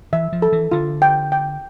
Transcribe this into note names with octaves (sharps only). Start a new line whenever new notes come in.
E3 E5
F3
A4
E3
D3 F4
G5
G5